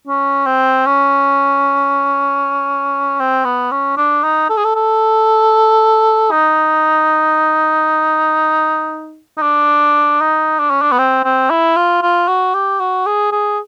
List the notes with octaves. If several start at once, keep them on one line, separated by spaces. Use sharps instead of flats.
C#4
C4
C#4
C4
B3
C#4
D4
D#4
A4
G#4
A4
A4
D#4
D#4
D4
D#4
D4
C#4
D4
B3
C4
C4
E4
F4
F4
F#4
G4
F#4
G#4
G#4